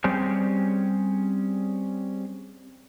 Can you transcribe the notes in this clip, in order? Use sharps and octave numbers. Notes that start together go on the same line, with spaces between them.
G3 C4 C#4 G4 G#4